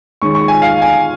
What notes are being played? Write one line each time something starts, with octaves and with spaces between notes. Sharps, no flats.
D#3 G#3 C#4 C#6
C#6
G#5
F5
G#5